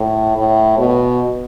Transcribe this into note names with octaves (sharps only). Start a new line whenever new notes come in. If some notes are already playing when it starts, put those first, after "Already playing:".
Already playing: A2
A2
B2